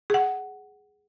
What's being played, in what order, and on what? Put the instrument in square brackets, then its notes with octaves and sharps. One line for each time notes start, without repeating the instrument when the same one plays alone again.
[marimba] G#4 F#5